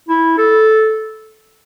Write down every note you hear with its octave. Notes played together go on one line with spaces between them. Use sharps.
E4
A4